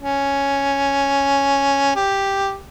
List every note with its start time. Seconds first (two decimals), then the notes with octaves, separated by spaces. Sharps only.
0.01 C#4
1.96 G4